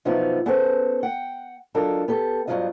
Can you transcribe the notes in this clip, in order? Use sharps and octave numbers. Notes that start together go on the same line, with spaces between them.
C3 F3 F#3 B3 D#4 F4
B3 C#4 G#4 A4 B4 C5
F#5 G5
F#3 D4 F4 A4 A#4 D#5
B3 G4 A4
G2 C#3 F#3 C4 F4 D#5